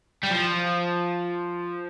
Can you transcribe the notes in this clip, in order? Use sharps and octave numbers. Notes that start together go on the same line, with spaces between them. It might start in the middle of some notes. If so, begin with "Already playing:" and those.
G3
F3